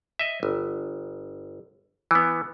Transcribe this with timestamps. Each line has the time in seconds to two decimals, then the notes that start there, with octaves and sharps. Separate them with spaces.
0.19 D#5 E5
0.43 G1
2.11 E3 B3